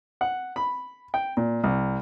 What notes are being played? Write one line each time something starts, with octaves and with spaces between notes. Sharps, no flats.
F#5
B5
G5
A#2
C2